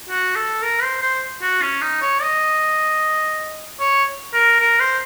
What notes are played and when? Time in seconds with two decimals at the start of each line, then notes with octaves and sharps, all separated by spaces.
0.10 F#4
0.36 A4
0.62 A#4
0.83 C5
1.02 C5
1.42 F#4
1.62 C#4
1.82 D#4
2.02 C#5
2.22 D#5
3.80 C#5
4.34 A#4
4.60 A#4
4.80 C5